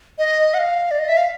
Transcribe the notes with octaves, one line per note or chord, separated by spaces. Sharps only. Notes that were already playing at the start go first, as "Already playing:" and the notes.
D#5
F#5
F5
D5
D#5
E5
F5